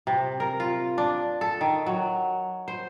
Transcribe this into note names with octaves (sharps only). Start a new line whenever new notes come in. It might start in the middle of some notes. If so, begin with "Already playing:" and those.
C3
A#4
F4
D4
A4
D#3
F#3
C5